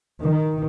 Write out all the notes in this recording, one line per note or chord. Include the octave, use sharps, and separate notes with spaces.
D#3